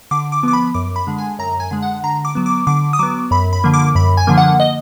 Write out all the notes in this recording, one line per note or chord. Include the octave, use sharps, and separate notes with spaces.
D3 D6
D6
F3 B3 D6
B5
F#2 D6
B5
D3 G#3
G#5
F#2 A#5
G#5
D3 G#3
F#5
D3 A#5
D6
F#3 B3
D6
D3 D6
D#6
F#3 B3 D6
F#2 B5
B5
D3 F3 A#3
D6
F#2 B5
G#5
D3 F3 A#3
F#5
D#5